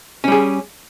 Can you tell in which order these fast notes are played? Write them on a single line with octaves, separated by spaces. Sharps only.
C#4 G3 G#4